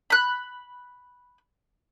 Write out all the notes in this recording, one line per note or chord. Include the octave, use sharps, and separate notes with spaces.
B5 F#6